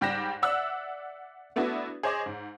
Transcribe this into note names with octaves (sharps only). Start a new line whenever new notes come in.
G#2 G3 G4 F#6 A#6 E7
D5 E5 F#5 E6 F#6
A3 B3 D4 E4 F#4
G#4 C5 C#5 D#5 D6
G#2